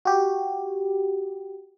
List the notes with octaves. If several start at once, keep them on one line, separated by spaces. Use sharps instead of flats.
F#4 G4